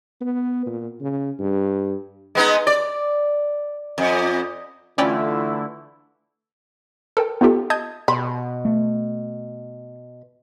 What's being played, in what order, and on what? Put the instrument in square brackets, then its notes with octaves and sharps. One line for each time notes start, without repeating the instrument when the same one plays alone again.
[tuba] B3
A#2
C#3
G2
[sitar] G#3 B3 D#4
D5
F2
[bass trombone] D3 [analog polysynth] E3 A3 E4 [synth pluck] C#4 D5 G5 [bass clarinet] F4
[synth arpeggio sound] A4 A#4 G5
B3 D#4 F4 G4 A4
D#5 A5 D#6 G6 G#6
[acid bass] B2 [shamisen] B5
[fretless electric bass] A3